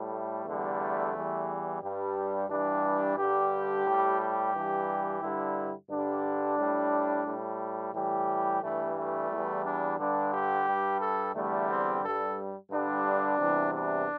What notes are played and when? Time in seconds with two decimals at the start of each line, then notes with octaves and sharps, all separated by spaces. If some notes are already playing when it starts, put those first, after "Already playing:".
Already playing: A2 G3
0.11 A3
0.45 E2 D3 G3
0.79 A3
1.13 E2 E3 G3
1.82 G2 G3
2.49 G2 E3 G3 D4
3.17 G2 D3 G3 G4
3.86 A2 G3
4.20 G4
4.54 G2 E3 G3
5.21 G2 D3 G3 E4
5.89 G2 D3 G3 D4
6.58 A2 G3
7.26 A2 G3
7.93 A2 E3 G3 G4
8.62 G2 E3 G3 A3
8.96 A3
9.29 E2 E3 G3
9.64 D4
9.98 G2 D3 G3 D4
10.32 G4
10.66 G2 G3
11.00 A4
11.34 E2 D3 G3 A3
11.68 C4
12.02 G2 G3 A4
12.70 G2 D3 G3 D4
13.38 E2 C3 E3 G3
13.72 D4